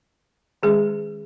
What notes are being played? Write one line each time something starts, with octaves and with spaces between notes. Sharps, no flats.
D#3 G#3 C#4 G#4